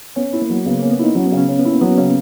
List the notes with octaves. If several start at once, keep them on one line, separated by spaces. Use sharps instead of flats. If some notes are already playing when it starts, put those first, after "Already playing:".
B3 C#4
E4
A#3
F#3
C#3 B3
A#3
C#4
B3
D#4 E4
F#3 C#4
B3
C#3
C#4
C#4
B3
A#3 E4
F#3 B3
C#3 C#4